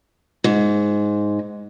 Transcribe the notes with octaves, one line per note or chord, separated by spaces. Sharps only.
G#2